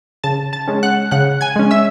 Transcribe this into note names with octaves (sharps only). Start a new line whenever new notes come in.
C#3 A5 A6
A5 A6
G#3 C#4
F#5 F#6
C#3 F#5 F#6
G#5 G#6
G#3 C#4
E5 E6